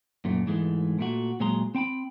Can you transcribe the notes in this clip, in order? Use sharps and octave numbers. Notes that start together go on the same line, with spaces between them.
F#2 A#2 A3
G#2 E3 G#3 A3
A#2 A3 F#4
A#2 F#3 G#3 G#4 A#5 C6
C4 G5 A5 B5